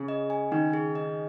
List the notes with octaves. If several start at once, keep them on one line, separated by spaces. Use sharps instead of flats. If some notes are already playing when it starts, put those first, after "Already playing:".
Already playing: C#3 G#4
D#5
G#5
D#3 D#4
G#4
D#5